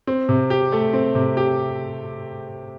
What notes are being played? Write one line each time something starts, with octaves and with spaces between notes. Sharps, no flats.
C4
C3
G4
A3
C4
C3
G4